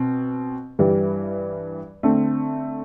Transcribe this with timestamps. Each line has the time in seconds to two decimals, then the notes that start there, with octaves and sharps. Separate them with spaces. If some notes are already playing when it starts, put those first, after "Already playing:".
Already playing: B2 C4
0.79 G2 E3 G3
2.03 D3 A3 C4